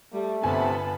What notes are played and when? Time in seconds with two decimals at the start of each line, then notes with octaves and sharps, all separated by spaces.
0.13 G3 A3
0.43 G1 C3 B3 G#5 A5 B5